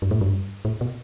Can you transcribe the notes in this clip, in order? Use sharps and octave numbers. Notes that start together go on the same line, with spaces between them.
G2
A2
G2
A2
B2